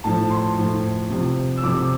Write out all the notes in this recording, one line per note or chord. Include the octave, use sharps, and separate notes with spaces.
A2 F3 A5
C6
A2 F3
C3 F3
E6
C3 F3 D6